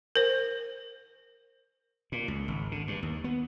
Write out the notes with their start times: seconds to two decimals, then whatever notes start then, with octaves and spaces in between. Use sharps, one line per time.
0.16 A#4 C5
2.12 A#2
2.28 C#2
2.48 G#1
2.72 D3
2.88 G2
3.03 D#2
3.24 B3